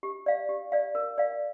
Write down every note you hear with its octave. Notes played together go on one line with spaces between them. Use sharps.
G4
D5 F5
G4
D5 F5
A#4
D5 F5